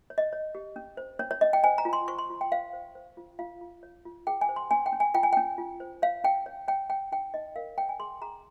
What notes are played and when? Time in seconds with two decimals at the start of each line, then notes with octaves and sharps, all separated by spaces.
0.10 C#5
0.18 D#5
0.33 C#5
0.55 G4
0.76 C#4
0.97 C5
1.19 C#4 C#5
1.31 C#5
1.41 C#4 D#5
1.53 G5
1.64 C5 G#5
1.78 A#5
1.85 F4
1.93 C6
2.08 C5 C#6
2.19 C6
2.30 F4
2.41 G5
2.52 C5 F5
2.73 C5
2.95 C5
3.17 F4
3.39 F4 F5
3.61 F4
3.83 C#5
4.05 F4
4.27 G#4 G5
4.41 G#5
4.49 C5
4.56 C6
4.71 C#4 G#5
4.86 G5
4.92 C#4
5.00 G#5
5.14 F4 G5
5.23 G#5
5.33 C#4 G5
5.58 F4
5.80 C5
6.02 C#5 F5
6.24 C#4 G5
6.46 C#5
6.68 C#5 G5
6.90 C#5 G5
7.12 D#4 G5
7.34 D#4 D#5
7.56 A#4 F5
7.78 C#5 G5
7.89 G#5
7.99 G#4 C6
8.22 G#4 A#5